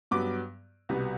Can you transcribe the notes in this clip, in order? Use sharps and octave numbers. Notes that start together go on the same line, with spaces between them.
G2 F#3 B3 D6
C2 B2 G3 B3